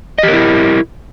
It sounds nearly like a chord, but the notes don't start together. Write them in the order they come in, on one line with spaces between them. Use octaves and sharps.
D#5 G4 A#4 E4